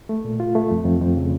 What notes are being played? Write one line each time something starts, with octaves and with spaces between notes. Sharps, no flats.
A3
A#2
F4
A3
F2
F2
F2
C#3